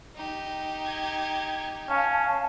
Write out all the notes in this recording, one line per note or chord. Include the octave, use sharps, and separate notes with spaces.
D#4 G4
G#6
C#4 F5 A5